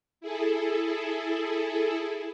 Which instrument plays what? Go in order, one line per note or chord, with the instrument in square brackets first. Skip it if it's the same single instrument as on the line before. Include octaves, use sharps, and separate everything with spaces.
[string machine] E4 G#4 A4